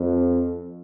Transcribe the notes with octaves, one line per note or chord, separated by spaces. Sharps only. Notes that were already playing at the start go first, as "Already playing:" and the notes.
Already playing: F2